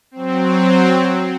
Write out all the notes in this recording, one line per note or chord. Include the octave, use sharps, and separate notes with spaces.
F#3 C4